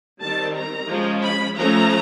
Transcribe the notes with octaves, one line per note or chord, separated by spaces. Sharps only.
D#3 G3 C4 A5
A#5
F3 G#3 C#4
B5
F3 A3 C#4 A#5